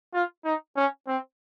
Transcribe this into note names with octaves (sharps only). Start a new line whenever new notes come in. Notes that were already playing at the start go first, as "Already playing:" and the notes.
F4
D#4
C#4
C4